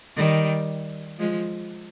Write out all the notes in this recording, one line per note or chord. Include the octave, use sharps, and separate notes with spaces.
D#3 G3
F3 G#3